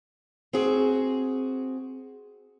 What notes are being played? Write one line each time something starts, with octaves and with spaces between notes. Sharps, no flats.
C4 F#4 G#4